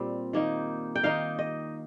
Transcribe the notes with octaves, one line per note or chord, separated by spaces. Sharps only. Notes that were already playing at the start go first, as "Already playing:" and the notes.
Already playing: A#2 G3 C4
D#3 A#3 D#4
G5
D#3 A#3 D#4 F5
D#5